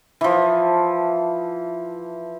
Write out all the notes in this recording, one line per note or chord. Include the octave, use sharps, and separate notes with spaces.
E3 F3